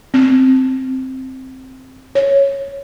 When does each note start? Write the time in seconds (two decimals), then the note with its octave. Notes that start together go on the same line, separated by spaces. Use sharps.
0.14 C4
2.15 C#5